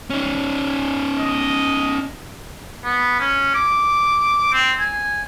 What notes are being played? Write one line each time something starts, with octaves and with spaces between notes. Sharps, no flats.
C#4 D#4
G#5
D#5
B3
C#4
D6
C4
G#5